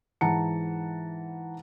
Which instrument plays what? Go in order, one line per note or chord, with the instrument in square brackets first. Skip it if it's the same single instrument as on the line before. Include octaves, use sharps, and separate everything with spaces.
[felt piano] G#2 E3 F#5 A5 A#5 C#7